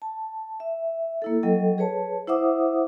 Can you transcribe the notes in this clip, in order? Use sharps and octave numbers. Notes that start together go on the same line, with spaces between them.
A5
E5
A#3 E4 A4
F#3 A4 D#5 G5
G#4 B4 C#5 A5
E4 C5 E5 F#5 D6 D#6